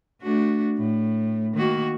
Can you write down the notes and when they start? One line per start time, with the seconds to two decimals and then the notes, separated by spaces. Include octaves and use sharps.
0.22 A3 D4 F#4
0.78 A2
1.55 D#3 A#3 F#4